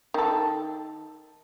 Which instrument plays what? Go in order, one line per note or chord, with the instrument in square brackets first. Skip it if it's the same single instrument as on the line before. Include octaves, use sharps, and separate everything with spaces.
[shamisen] D#3 A4